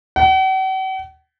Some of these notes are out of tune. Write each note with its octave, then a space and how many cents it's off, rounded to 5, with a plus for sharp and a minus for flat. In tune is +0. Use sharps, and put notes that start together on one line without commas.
F#5 +45